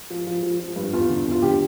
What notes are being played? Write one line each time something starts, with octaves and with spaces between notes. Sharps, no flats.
F3
F3
F3
F3
G2
E2 F4
D3
E2 F4
D3 G4